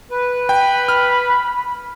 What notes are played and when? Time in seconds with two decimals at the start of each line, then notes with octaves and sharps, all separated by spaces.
0.11 B4
0.49 G5 B5
0.89 F6